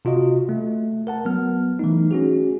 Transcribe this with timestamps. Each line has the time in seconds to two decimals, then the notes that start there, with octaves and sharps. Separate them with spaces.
0.05 C3 F4 F#4 D#5
0.49 A3
1.07 A#4 F#5 A5
1.25 F#3 B3 F6
1.79 E3 A3 D#4
2.11 C#4 F#4 G#4